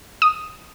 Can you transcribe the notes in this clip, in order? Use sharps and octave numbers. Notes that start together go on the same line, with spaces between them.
D#6